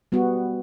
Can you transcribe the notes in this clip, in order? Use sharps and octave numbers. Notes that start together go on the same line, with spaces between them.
G3 B3 F#4